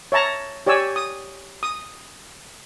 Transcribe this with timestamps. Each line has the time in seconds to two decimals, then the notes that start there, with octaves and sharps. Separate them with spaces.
0.12 C#5 E5 A5 A#5
0.66 G4 C#5 D5 G#5 E6
0.96 D#6
1.63 D#6